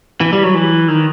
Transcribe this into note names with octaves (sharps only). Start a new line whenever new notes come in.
E3
G3
F#3
E3
D#3